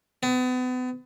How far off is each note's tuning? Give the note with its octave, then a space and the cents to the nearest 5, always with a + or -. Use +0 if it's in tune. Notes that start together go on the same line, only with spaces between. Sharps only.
B3 +35